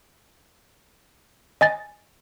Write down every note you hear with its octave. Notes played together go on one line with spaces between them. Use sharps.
D#5 G#5 A6